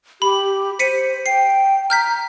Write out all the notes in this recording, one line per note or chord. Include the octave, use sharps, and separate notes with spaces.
G4 B5
C5 B6 C#7 D#7
G5 C7
A#5 F6 G6 B6